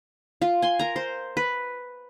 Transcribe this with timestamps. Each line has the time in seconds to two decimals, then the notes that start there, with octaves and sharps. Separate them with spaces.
0.42 F4
0.62 G#5 C6
0.79 A#4 A#5
0.96 C5
1.37 B4